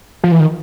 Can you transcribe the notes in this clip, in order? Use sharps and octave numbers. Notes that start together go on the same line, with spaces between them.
F3
E3
D#3